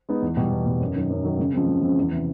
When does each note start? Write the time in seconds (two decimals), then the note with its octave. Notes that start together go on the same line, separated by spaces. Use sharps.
0.09 G#3 B3 D#4
0.22 E2
0.37 B2 G3
0.51 E2
0.66 B2 G3
0.80 F#2
0.96 D#3 F#3
1.10 F#2
1.24 D#3 F#3
1.39 C#3
1.53 F3 G#3 C4
1.68 C#3
1.83 F3 G#3 C4
1.97 E2
2.12 C3 E3